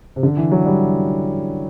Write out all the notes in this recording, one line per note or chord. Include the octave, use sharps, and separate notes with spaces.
C3
D3
E3
F#3
G3